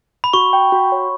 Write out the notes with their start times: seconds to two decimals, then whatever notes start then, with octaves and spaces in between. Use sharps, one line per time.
0.24 B5
0.33 F#4 C#6
0.53 G5
0.72 F#4
0.92 C#5